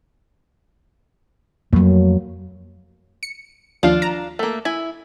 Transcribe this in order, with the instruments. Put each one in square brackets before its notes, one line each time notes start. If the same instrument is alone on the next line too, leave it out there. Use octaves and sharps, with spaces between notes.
[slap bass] F2 A3 [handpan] F#3 A#3
[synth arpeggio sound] C#7
[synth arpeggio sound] D#2 F3 F5 [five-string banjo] D4 F4
[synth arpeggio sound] A#5
[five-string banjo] A3 A#3
[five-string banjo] E4 [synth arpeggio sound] G#5